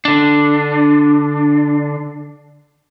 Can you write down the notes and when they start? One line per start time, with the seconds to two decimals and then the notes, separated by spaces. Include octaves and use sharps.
0.05 D3 D4